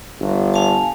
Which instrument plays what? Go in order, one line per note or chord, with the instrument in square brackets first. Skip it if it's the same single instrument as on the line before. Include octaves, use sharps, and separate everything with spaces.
[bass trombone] G1
[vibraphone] F5 G#5 A5